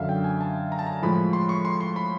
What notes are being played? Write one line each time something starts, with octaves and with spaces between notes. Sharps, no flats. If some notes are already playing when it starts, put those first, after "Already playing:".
Already playing: F#2 D3 F#3 E5 F5
G5
G#5
A5
A#5
A5
A#5
A2 F3 G#3 B5
C6
C#6
C6
C6
B5